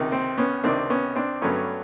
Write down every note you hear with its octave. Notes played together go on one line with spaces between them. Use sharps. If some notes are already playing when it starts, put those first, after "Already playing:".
Already playing: C#2 C3 D#3
C4
B3 C#4
C#2 C3 D#3 C4 D4
B3 C#4
C4 D4
G2 D3 F#3 A3 B3 C#4